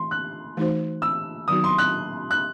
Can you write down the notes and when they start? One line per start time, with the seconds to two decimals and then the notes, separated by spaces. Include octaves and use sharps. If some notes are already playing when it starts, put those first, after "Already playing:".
Already playing: E3 A3 C6
0.11 F#6
0.57 E3 A3 D#4 F#4 C5
1.02 E6
1.48 D#3 F#3 B3 D#4 F#4 D#6
1.64 C6
1.78 F#6
2.31 F#6